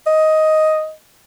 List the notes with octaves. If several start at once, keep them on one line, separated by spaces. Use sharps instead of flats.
D#5